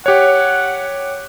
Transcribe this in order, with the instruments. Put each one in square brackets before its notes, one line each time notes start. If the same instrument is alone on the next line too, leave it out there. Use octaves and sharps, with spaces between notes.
[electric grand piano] G4 C#5 [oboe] F#5